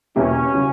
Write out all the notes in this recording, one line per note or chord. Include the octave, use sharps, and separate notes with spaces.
E2 B2 A#3 C#4 E4 G4
C#3 F#3